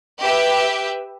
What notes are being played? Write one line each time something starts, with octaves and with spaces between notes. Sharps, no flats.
G4 B4 E5